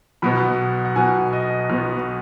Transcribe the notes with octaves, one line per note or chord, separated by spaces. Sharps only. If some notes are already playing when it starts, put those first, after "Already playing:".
B1 B2 B3 B5
F#5
B1 B2 B3 G#5
D#5
B1 B2 B3